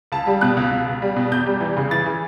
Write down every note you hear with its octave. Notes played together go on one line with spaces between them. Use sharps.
C#2 A5
G3
B2 F#6
C#2
B2
C#2
G3
B2
E2 G6
G3
E3
C#3
E3 A6
E3